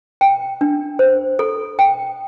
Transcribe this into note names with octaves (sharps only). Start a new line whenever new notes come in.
G5
D4
C5
A4
G5